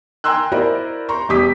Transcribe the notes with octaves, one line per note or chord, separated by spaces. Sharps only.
G5 G#5 A#5 C6 E6 F#6
E4 F#4 A#4 C5 D5 D#5
A#5 C6 C#6
E1 G3 G4 D6 D#6 B6